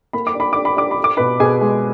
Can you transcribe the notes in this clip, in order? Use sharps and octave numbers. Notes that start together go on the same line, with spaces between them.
A#3 B5
D6
D4 B5
D4 D6
B5
D4 D6
B5
D4
D6
B2 B4 B5
B2 G#4 G#5
G#3